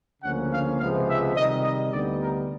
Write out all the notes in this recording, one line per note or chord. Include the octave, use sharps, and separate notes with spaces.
D2 C#3 F3 A#3 C#4 F#5
F5
C#2 C3 F3 G#3 B3 F5
E5
C3 D#3 G3 D#5
D#5
D2 D3 G3 B3 D#4 D5
A#4